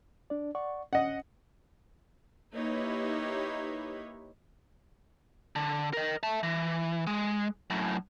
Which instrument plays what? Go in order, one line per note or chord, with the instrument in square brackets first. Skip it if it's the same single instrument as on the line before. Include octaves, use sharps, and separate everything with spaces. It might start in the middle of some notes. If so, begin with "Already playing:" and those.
[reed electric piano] D4 D5
D5 F#5 C#6
[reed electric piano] C#4 [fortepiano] D#5 F#5
[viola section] A#3 D#4 E4 G4 B4 C#5
[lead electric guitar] D3
A#4 D#5
E5 A5
E3
G#3
F#2 A2